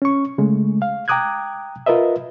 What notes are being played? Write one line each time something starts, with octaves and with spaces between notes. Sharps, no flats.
C#4 C#6
C#3 G#3 A3
F5
G5 A#5 D6 D#6 F#6 G#6
F4 A#4 B4 D#5 E5